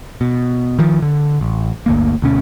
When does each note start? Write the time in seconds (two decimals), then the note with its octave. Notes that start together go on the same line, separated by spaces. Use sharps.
0.21 B2
0.79 D#3 F3
1.02 D3
1.41 A1
1.86 G1 D2 A#3
2.22 D2 B2 C#4